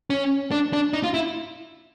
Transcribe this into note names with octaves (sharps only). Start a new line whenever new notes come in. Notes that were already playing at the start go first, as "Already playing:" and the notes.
C#4
D4
D4
D#4
F4
E4